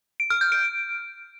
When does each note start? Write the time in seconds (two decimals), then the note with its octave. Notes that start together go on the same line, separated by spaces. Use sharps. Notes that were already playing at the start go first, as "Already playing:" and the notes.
0.20 D7
0.30 F6
0.41 G6
0.52 D7